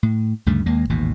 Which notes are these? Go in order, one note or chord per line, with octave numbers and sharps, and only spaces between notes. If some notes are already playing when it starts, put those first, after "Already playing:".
A2
D2 G2 C#3 A3
D#2 G#3 A#3
A1 D#2 G#2 B2